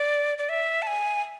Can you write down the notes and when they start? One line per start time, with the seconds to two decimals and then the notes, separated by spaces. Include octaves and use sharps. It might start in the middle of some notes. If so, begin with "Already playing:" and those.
Already playing: D5
0.38 D5
0.49 E5
0.82 A5
0.87 G#5